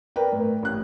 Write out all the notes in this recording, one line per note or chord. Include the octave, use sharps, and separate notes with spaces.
A#4 B4 D5 G5
A2
A1 F#6